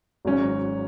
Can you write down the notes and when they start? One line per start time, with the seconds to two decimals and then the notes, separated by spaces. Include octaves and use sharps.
0.25 G#1 G#2 F#3 C#4